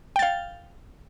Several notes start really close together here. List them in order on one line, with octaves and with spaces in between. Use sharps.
G5 A6 F5